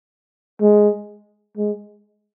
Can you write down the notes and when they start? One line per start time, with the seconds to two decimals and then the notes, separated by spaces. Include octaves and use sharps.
0.61 G#3
1.57 G#3